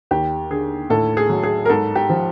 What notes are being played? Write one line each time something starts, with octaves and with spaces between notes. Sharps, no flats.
D#2 G4
D3 G#4
A2 A4
G#4
F#3
G#4
A#4
G#2 A4
G4
F3